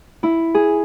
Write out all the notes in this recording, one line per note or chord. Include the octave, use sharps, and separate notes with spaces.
E4
G#4